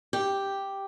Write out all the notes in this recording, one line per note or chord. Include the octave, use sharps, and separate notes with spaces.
G4